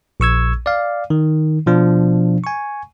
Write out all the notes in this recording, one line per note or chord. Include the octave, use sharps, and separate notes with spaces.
A#1 C#6 E6 G#6
D5 F5
D#3
B2 F3 D4 F4
G#5 C#6